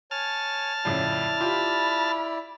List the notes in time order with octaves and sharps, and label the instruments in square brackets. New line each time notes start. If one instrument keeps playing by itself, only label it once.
[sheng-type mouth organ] C#5 G#5 [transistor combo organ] A5 F6
[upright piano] F2 A2 C#3 [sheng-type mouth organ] E4 D5
[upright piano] F4 G4 [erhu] B5